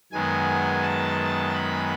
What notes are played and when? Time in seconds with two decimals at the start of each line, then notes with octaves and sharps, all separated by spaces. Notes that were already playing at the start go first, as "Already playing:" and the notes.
0.12 F#2 D#3 G#3 B3 G#5
0.83 A5
1.54 B5